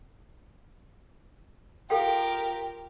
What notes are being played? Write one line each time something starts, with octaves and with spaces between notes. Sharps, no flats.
F4 G4 A4 A#4 F5 G5